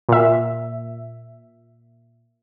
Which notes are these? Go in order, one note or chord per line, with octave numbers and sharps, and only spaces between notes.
A#2 E5